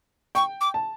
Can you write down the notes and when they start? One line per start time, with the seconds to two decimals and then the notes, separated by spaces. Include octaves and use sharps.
0.35 G5 C#6
0.61 D6
0.74 A5